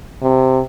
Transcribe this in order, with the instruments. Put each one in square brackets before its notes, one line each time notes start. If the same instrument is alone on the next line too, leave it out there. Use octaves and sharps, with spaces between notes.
[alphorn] C3